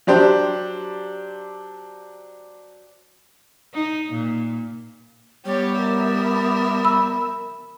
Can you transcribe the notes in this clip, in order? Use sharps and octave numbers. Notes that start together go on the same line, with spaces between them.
F#3 D4 G4 C5
D#4
A#2
G3 B3 G4 C#5
A#4 E5
B5 E6